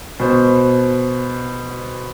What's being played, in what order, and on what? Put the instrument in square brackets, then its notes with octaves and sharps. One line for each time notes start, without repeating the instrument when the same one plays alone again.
[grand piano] B2 C5